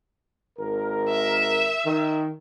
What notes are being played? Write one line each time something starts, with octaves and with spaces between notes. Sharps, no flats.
G#1 A#4
E5
D#3